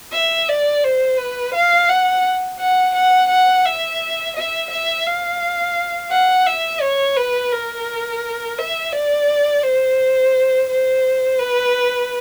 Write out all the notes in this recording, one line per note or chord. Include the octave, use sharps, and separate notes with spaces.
E5
D5
C5
B4
F5
F#5
F#5
F#5
F#5
E5
E5
E5
F5
F#5
E5
C#5
B4
A#4
E5
D5
C5
C5
B4